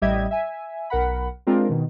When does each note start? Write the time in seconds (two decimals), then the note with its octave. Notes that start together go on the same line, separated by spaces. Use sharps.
0.02 A1 G3 G4 D#5 E5 G#6
0.31 E5 G#5
0.90 B1 A#4 F#5 B5
1.47 G#3 C4 D4 F4 A#4
1.69 B2 D#3